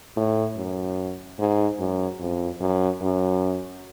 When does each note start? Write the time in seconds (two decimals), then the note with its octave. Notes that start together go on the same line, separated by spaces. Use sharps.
0.17 A2
0.57 F#2
1.39 G#2
1.79 F#2
2.20 F2
2.61 F#2
3.01 F#2